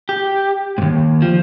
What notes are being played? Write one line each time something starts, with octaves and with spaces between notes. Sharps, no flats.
G4
D#2 G#2
F3